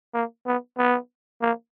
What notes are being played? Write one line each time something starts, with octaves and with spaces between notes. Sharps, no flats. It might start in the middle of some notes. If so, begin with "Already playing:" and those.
A#3
B3
B3
A#3